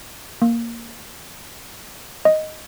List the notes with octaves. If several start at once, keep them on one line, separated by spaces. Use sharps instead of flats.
A#3
D#5